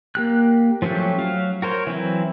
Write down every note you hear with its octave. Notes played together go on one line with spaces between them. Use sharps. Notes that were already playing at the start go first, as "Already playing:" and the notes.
A#3 G4 F#6
F3 F#3 A3 C#4 G4
F#3 F5
F#4 A#4 C5 C#5
E3 F#3 C4 E4